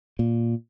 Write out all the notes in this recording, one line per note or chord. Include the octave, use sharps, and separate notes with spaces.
A#2